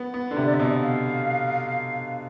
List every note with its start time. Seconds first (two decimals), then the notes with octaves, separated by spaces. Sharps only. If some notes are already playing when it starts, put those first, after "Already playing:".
Already playing: B3
0.14 B3
0.31 D3
0.36 C3 E5
0.45 D5
0.53 E5
0.60 B2
0.82 F5